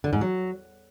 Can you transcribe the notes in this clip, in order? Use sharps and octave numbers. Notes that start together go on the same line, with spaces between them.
D3
G#2
F#3